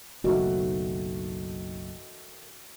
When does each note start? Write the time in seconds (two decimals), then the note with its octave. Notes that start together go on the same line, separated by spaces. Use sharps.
0.24 F#1 B1 D#3 A3 F#4